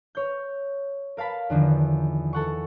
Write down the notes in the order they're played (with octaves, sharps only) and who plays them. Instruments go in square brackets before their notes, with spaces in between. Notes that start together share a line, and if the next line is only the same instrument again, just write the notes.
[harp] C#5 G6
A#4 F5 A5 B5
E2 D3 D#3 F3
A4 F#5 C#6